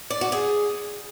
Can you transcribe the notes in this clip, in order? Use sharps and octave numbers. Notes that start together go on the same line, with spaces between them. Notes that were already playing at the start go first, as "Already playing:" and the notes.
D5
F#4
G#4